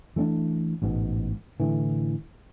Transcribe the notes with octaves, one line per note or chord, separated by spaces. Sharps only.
E3 A3 C#4 D4
A1 G#2 B2
A2 D3 E3